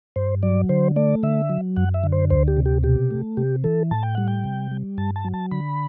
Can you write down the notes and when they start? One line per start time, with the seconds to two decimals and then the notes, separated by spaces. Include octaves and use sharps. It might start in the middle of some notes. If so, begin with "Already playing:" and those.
0.16 G2 C5
0.43 F#3 D5
0.69 D3 C5
0.96 A3 D5
1.23 D3 E5
1.49 F#3
1.77 F#2 F#5
1.94 E5
2.04 D3
2.12 C5
2.30 D2 C5
2.48 G4
2.57 C3
2.66 G4
2.83 B2 G4
3.11 A3
3.37 C3 G4
3.64 E3 A4
3.91 A2 A5
4.03 G5
4.15 G3 F#5
4.28 G5
4.44 C3
4.71 G3
4.98 G2 A5
5.16 A5
5.25 F#3
5.34 A5
5.51 D3 B5